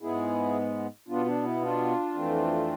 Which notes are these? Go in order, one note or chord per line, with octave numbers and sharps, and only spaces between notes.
G#2 G#3 B3 E4 G#4
B2 B3 D4 F4
D4
E4
D4 F4
F2 E3 A3 C4